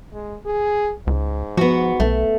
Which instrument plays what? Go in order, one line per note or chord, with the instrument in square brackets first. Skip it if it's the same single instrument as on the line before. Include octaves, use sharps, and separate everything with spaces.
[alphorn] G#3
G#4
[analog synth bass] C#2 [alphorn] G#2
[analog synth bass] F3 [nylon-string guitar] B3 F#4
[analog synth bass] B1 [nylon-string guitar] A3